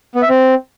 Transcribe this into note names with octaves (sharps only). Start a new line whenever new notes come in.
B3
E5
C4